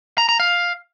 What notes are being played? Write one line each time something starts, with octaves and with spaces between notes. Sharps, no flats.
A#5
A#5
F5